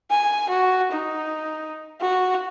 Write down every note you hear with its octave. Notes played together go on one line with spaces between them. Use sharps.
G#5
F#4
D#4
F#4